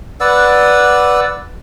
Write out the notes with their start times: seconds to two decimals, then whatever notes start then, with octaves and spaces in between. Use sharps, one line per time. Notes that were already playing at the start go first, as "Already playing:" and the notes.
0.20 B4 D5 F#5 E6